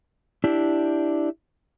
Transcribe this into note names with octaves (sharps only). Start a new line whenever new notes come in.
D4 E4 G4